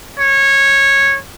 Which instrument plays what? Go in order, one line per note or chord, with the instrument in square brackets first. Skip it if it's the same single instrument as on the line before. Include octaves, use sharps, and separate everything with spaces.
[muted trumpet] C#5